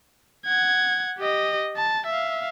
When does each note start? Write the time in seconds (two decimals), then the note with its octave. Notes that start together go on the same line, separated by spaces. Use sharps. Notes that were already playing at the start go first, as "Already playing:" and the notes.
0.46 F#5 G#6
1.18 G4 D#5
1.77 A5
2.06 E5 F5